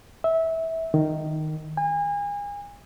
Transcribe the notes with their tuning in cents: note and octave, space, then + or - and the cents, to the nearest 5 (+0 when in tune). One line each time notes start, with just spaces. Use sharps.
E5 -20
D#3 -5
G#5 -35